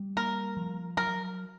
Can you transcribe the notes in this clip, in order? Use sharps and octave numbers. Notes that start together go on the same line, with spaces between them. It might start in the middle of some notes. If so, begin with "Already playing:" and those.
Already playing: G3
A#3 A#4
F3
F#3 A#4